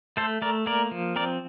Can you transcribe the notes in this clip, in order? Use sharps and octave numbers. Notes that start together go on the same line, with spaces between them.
A3 A4 C5
A3 A#4 D5
A#3 A#4 D5
F3
C4 A#4 D5